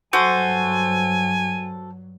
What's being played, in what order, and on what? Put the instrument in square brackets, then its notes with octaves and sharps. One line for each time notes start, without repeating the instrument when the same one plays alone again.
[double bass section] G2 F#3 [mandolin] F#4 A4 C5 [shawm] G#5